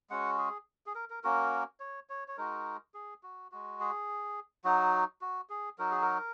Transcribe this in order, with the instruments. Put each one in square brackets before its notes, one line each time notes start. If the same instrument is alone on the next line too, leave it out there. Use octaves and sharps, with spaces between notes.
[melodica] G#3 C#4 F#4 F#5
G#4
G#4
A#4
A#4
A#3 C#4 F#4 A#4
C#5
C#5
C#5
G#3 D#4 F#4 A#4
G#4
F#4
G#3 F#4
G#4
F#3 D#4 F#4
F#4
G#4
F#3 D#4 F#4 A#4
G#4
A#4